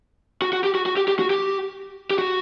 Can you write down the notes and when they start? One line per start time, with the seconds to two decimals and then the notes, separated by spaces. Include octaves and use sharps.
0.42 F#4
0.53 F#4
0.64 G4
0.75 F#4
0.86 F#4
0.97 G4
1.08 G4
1.19 F#4
1.30 G4
2.10 G4
2.18 F#4